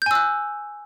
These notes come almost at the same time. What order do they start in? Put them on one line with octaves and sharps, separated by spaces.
G6 G#5 E6 F#6